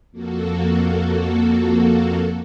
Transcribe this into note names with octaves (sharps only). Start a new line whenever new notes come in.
F2 A#3 F#4 A4